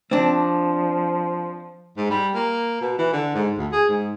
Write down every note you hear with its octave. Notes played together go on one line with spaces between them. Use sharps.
F3 C4 D4
G#2
G3
A#3
B2
E3
D3
G#2
D2
G#4
G#2